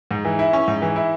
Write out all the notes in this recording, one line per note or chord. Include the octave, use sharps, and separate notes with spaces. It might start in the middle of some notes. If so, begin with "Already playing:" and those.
G#2
E3
E4
C#4
G#2
E3
E4